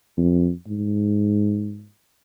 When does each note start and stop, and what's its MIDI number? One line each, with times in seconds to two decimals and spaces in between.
0.17 0.50 41
0.68 1.86 44